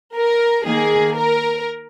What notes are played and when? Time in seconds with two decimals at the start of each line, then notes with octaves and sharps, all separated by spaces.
0.15 A#4
0.65 D#3 A#3 G#4
1.16 A#4